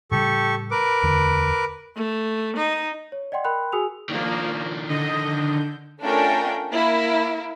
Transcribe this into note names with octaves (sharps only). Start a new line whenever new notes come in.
A2 C#3 G3 G4 A4 C#6
A#4 B4 D6
D1 E2 D3
A3
D#4
C#5
D5 D#5 F#5 G5 C6
A#4 G5 B5 C6 F#6
F#4 G#4 G#5 D#6 E6 F7
D#3 F3 A#3 D4
D3 D#5 G6
A3 C#4 D4 F4 A#4 G5
A#3 E4